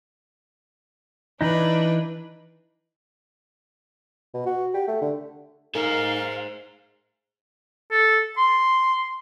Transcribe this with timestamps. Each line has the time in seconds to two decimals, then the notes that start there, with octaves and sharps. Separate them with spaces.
1.41 E3 D4 D#4 B4
4.34 B2
4.46 F#4
4.74 G4
4.88 A3
5.01 D3
5.75 D#4 G#4 A#4 C5 F5 G#5
7.91 A4
8.37 C6